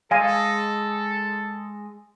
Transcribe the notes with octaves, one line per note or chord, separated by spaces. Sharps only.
G#3 A4 D#5 F5 G#5